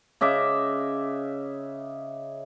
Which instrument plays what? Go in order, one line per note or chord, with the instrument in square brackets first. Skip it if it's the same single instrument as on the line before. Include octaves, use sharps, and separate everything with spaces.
[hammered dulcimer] C#3 D#5 E5 D6